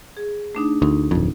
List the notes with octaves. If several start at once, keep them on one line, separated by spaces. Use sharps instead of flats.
G#4
A3 D4 D#4
D2 D#4
D1 F2